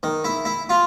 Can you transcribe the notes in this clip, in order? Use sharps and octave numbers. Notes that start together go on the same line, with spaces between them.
D#3
E4
E4
F4